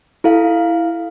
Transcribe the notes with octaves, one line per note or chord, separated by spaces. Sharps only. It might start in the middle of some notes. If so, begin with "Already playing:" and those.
E4 A4 F5